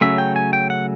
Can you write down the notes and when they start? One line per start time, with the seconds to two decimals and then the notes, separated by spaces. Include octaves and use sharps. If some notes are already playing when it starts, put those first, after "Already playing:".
0.01 C#3 F#3 A3 C#4 E5
0.18 G5
0.36 G#5
0.53 G5
0.70 F#5